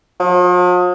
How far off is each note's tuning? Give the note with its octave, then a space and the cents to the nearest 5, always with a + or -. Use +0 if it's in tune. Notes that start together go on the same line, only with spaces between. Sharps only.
F3 +45